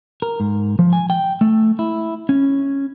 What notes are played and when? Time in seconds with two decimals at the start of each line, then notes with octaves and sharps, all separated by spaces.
0.22 A#4
0.40 G#2
0.79 F3
0.93 G#5
1.10 G5
1.41 A3
1.79 E4
2.29 C#4